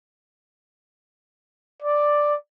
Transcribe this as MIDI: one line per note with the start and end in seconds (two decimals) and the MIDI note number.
1.82 2.33 74